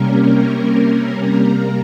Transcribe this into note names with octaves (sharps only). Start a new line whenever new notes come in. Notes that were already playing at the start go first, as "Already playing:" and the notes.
Already playing: C3 G3 A#3 C#4 A#4
C3 G3 A#3 A#4